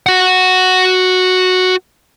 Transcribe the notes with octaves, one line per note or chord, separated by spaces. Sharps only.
F#4 F#5